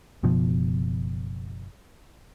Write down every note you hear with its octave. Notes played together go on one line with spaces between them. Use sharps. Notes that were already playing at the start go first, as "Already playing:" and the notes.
F#1 B2 F3